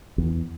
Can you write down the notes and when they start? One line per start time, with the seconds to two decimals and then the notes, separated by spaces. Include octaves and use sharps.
0.18 E2